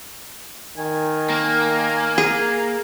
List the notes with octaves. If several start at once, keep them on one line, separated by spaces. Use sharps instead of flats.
D#3 G#5
A#3
G#4